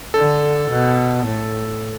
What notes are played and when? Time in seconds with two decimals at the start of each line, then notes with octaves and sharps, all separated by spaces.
0.14 D3 A4
0.70 B2
1.25 A2